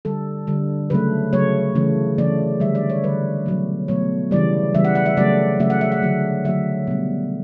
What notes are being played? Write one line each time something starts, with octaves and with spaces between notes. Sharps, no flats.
D3 G3 A4
D3 G3
C#3 F#3 A3 B4
C#3 F#3 A3 C#5
C#3 E3 A3
C#3 E3 A3 D5
D3 G3 E5
D5
C#5
D3 G3 B4
B2 F#3 A3
B2 F#3 A3 C#5
C#3 E3 G3 D5
C#3 E3 G3 E5
F#5
F#5
E5
C#3 F#3 A3 D5
C#3 F#3 A3 E5
F#5
E5
F#5
D3 F#3 A3
D3 F#3 A3 E5
B2 G3